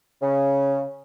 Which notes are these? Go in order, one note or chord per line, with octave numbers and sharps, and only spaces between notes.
C#3